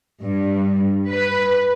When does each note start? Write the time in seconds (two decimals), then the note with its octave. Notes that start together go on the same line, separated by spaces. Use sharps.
0.22 G2
1.10 B4